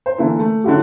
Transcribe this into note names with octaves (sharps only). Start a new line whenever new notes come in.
C5
D3 E3 A#3 E4
A3
D3 F#3 E4 F#4 G4